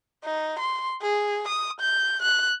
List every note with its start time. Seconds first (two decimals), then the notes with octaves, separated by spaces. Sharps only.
0.25 D#4
0.60 C6
1.02 G#4
1.49 D#6
1.81 G6
2.22 F#6